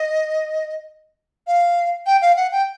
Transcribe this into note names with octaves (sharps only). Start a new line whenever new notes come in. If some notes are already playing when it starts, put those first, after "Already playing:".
Already playing: D#5
F5
G5
F5
F#5
G5